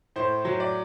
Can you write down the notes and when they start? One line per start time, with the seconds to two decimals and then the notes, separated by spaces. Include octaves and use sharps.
0.16 A2 C5
0.45 F#3
0.60 D5